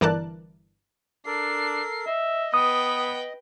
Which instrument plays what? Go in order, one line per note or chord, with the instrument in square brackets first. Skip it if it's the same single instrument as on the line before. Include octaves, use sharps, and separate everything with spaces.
[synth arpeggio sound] G1 E3 A#4 D5 A5 F#6
[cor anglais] D4 [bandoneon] A4 A#4 [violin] C7
[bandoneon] D#5 [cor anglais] E5
[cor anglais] B3 [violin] B4 G5 [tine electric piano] D#6